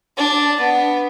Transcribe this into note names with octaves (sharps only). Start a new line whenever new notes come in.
D4
B3